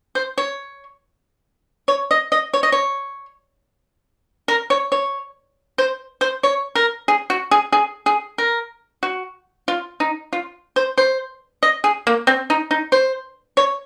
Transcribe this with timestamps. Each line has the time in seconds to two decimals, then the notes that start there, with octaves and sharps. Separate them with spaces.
0.15 C5
0.38 C#5
1.88 C#5
2.11 D#5
2.32 D#5
2.54 C#5
2.63 D#5
2.72 C#5
4.48 A#4
4.70 C#5
4.92 C#5
5.78 C5
6.21 C5
6.43 C#5
6.75 A#4
7.08 G#4
7.30 F#4
7.51 G#4
7.72 G#4
8.06 G#4
8.38 A#4
9.03 F#4
9.68 F4
10.00 D#4
10.33 F4
10.76 C5
10.98 C5
11.63 D#5
11.84 G#4
12.07 A#3
12.27 C4
12.50 D#4
12.71 D#4
12.92 C5
13.57 C#5